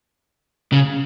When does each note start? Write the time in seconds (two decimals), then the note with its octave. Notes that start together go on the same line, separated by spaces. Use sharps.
0.73 C#3